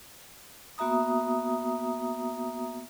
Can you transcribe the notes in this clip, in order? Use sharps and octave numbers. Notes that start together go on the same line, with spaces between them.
A#3 B3 F#4 E5 A#5 D#6